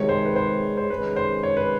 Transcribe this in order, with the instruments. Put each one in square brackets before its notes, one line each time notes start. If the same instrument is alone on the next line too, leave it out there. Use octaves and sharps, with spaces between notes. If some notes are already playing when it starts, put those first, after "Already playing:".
Already playing: [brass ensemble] C3 D#3 G#3 [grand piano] C#5
[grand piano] C5
B4
C5
C5
[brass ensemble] C3 D#3 G#3 C#4 [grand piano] B4
[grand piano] C5
C#5
B4